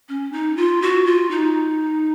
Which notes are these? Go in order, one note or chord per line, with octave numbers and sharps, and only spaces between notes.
C#4
D#4
F4
F#4
F4
D#4